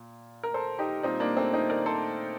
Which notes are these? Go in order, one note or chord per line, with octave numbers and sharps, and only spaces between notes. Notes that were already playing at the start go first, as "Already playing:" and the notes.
Already playing: A#2
A#4
A4 C5
D#4 G4
A#2 G3 C4 D#4
A#3 D4
A3 C4
C4 D#4
A#4 D5
A4 C5